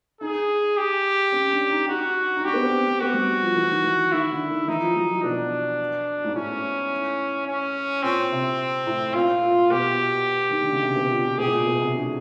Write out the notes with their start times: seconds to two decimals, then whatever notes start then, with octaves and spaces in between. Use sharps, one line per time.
0.21 D#4 G#4
0.77 G4
1.32 C#4
1.51 D4
1.70 D#4
1.89 D#4 F#4
2.37 D#4
2.44 D4 G4
2.54 B3
2.58 C4
2.72 C4
2.86 C4
3.00 B3 F#4
3.14 G3
3.43 F3
3.56 E3
3.70 D#3
3.84 E3
4.12 D#3 E4
4.31 D3
4.50 D#3
4.68 E3 D#4
4.82 F3
4.96 F#3
5.11 F3
5.23 B2 D4
6.24 G#2
6.36 A2 C#4
7.47 C#4
8.03 A#2 C4
8.32 C3
8.87 A2
9.14 A#2 F4
9.42 A#2
9.71 B2 G4
10.50 D#3
10.61 D3
10.72 C#3
10.83 C3
10.96 B2
11.10 A#2
11.25 A#2
11.38 B2 G#4
11.46 A2
11.53 A#2
11.66 B2
11.80 C3
11.94 D3